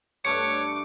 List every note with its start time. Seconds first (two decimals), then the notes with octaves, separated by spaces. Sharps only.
0.25 G2 A3 D4 C#5 D6 C#7